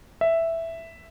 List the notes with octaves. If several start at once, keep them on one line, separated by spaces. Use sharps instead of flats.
E5